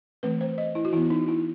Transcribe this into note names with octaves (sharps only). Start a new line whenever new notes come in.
E3 A3 C4 B4
C5
D#5
E4
F#4
E3 B3 E4
D#4
E4